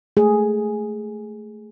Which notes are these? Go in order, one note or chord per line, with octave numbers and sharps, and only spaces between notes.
A3 G#4